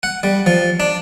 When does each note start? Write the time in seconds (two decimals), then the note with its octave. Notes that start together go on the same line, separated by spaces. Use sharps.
0.03 F#5
0.23 G3
0.46 F3
0.80 D4